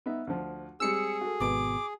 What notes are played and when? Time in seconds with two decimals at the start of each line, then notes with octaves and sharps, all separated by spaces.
0.06 B3 D#4 E5
0.27 D2 F3
0.80 G3 G#3 C4 G#4 E6 C#7
1.21 F#4 A4
1.40 G#1 B2 D6